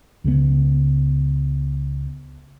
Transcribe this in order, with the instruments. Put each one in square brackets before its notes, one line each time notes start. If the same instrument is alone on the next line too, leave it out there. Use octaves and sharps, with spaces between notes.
[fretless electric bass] C#2 C#3 E3 B3